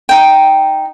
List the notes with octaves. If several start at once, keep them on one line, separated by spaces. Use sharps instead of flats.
D#4 G5